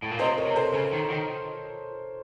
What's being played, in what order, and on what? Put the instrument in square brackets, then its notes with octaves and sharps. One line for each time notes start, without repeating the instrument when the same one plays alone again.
[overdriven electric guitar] A2
A#2
[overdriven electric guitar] C3 [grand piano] C5 D#5
[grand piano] A#4 C#5
[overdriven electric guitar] C3
[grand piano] A4 C5
[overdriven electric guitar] C#3
D#3
D#3